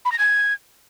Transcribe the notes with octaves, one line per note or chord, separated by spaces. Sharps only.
B5
A#6
G#6